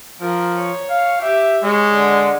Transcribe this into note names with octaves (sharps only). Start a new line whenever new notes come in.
F3 A#4
C#5
F5
G4 E5
G#3 C#5
D3